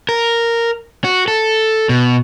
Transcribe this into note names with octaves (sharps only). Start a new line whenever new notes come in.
A#4
F#4
A4
B2